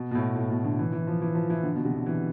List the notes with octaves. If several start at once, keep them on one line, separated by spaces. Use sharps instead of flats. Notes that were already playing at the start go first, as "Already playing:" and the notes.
Already playing: B2
B2
A2
A2
B2
D3
E3
E3
F3
E3
F3
E3
D3
B2
C3
D3
E3